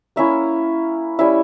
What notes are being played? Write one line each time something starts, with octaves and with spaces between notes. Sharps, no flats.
A#3 C#4 E4 E5
G3 C#4 E4 E5